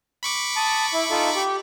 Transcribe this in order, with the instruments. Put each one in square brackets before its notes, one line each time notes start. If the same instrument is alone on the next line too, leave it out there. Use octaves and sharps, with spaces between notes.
[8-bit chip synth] B5 C#6 D6
[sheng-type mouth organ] A5 D#6
E4
D#4 F4 A4
G4